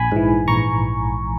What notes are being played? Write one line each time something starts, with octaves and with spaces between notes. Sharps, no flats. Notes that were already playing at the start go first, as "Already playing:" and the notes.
Already playing: A#1 G#5 B5
G#2 E3
A#1 A#5 C#6